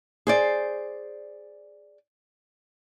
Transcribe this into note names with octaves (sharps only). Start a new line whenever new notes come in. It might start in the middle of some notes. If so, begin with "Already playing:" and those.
G#4 C5 D5